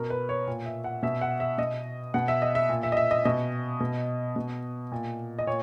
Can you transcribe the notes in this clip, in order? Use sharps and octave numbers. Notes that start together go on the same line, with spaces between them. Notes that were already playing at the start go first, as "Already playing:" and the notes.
Already playing: B2 A#4
B4
C#5
A#2
E5
F#5
B2 E5
F#5
E5
B2 D#5
B2 F#5
E5
D#5
E5
A#2
E5
D#5
E5
D#5
B2 D#5
B2
B2
A#2
D#5
A#2 C#5